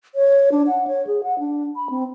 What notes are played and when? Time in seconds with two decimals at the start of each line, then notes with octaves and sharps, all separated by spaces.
0.15 C#5
0.52 D4
0.67 F#5
0.87 C#5
1.07 G#4
1.23 F#5
1.39 D4
1.76 B5
1.90 C4